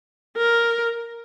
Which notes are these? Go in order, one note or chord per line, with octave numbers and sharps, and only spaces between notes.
A#4